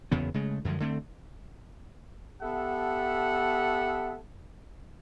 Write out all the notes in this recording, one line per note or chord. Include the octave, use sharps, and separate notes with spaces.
F#1 E2 C#3 B3
C#3 G#3 A3
F#2 D3 F3 G#3
D3 A3 C4
B3 G4 A4 E5 F#5 A5